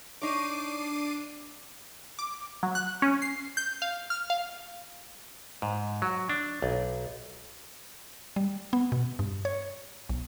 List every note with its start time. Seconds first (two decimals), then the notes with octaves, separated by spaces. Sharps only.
0.21 D4 D#4 C#5 D6 C7 D#7
2.19 D6
2.63 F#3
2.75 F#6
3.02 C#4
3.22 C7
3.57 G6
3.82 F5
4.10 F6
4.30 F5
5.62 G#2
6.02 F#3
6.30 D4
6.62 B1
8.36 G3
8.73 B3
8.92 B2
9.19 G2
9.45 C#5
10.09 B1